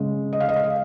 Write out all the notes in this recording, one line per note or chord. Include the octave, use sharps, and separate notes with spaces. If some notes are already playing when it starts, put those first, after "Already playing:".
Already playing: C#3 G#3
D#5
F5
D#5
F5
D#5